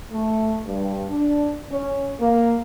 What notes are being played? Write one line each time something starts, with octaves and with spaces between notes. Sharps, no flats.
A3
G2
D4
C#4
A#3